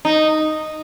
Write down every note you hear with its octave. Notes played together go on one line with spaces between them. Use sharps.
D#4